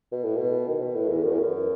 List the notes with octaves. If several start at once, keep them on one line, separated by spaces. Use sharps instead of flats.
B2
A2
B2
D#3
B2
A2
E2
F#2
E2
F#2